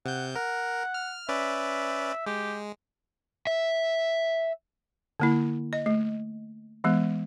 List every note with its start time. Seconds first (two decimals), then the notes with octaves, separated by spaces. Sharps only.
0.06 C3 F#5 G6
0.35 A#4 F#5
0.94 F6
1.29 C#4 B4 D5 E5
2.27 G#3 G4
3.47 E5
5.20 D3 A#3 E4
5.73 D#5
5.86 A3
6.84 E3 G#3 B3